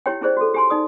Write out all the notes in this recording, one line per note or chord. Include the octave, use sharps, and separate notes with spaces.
E4 G4 C#5 G5
C#4 E4 G#4 C5 D5
F#4 A4
G4 G#5 C6
D#4 D5 D#6